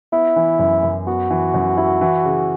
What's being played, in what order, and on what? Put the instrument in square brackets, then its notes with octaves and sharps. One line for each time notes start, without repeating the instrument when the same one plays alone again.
[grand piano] B3 [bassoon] E4
[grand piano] E3
F#2
F#2
[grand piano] B3 [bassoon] F#4
[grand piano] E3
F#2
E4
E3
C#3